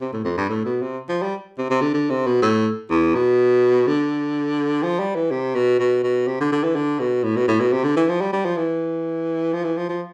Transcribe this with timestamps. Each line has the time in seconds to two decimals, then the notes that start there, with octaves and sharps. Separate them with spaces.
0.01 C3
0.13 A2
0.25 F2
0.37 G2
0.49 A2
0.65 B2
0.82 C3
1.09 F3
1.22 G3
1.58 C3
1.70 C3
1.81 D3
1.94 D3
2.10 C3
2.27 B2
2.42 A2
2.90 E2
3.15 B2
3.87 D3
4.83 F3
4.99 G3
5.15 E3
5.31 C3
5.55 B2
5.79 B2
6.03 B2
6.27 C3
6.40 D3
6.52 D3
6.64 E3
6.75 D3
7.00 B2
7.24 A2
7.36 B2
7.48 A2
7.60 B2
7.72 C3
7.84 D3
7.96 E3
8.09 F3
8.21 G3
8.33 G3
8.45 F3
8.57 E3
9.53 F3
9.64 E3
9.77 F3
9.89 F3